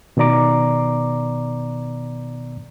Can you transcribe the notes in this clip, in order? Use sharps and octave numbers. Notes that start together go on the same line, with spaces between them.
B2 D#3 B3 D5 A#5 D6